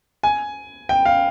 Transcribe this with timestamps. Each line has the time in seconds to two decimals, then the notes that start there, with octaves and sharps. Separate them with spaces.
0.23 G#5
0.89 G5
1.05 F5